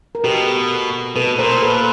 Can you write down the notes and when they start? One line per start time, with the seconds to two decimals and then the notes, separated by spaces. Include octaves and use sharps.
0.15 A#4
0.24 B2 G4 A4
1.16 B2 A4 B4
1.39 A#2 A#4 C5
1.62 A4 B4